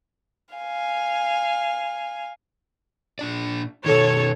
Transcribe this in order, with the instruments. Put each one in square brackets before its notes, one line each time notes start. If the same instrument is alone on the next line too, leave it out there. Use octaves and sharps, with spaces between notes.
[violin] F5 G#5
[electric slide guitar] A#2 D4 D5
[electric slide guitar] B2 D#3 [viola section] A4 C#5